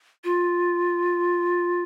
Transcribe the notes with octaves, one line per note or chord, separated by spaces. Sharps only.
F4